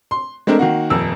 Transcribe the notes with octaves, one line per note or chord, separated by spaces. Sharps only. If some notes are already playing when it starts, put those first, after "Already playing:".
C6
G#3 A3 C4 D4 A#4
D#3 A#3 F#4
D#1 F2 E6